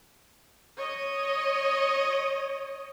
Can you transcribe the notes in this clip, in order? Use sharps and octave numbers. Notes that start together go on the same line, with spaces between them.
C#5 D#5